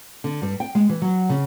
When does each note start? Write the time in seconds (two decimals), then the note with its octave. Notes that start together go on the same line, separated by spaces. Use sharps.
0.24 D3
0.42 G2
0.60 G5
0.75 G#3
0.89 E3
1.02 F#3
1.29 C#3